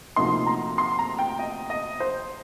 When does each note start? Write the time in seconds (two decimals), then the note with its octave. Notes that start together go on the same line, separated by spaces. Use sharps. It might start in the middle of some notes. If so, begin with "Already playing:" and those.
0.16 D2 C3 F3 A#3 D#4 C6
0.47 A#5
0.78 C6
0.99 A#5
1.19 G5
1.39 D#5
1.70 D#5
2.00 C5